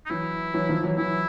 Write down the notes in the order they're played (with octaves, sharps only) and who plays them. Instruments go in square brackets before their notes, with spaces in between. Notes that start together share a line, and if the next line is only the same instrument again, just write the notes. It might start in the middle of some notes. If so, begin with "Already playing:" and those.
[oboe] D#4
[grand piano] E3 F#3 [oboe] E4
[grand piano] E3 F#3
D#3 F3
E3 F#3
[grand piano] E3 F#3 [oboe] E4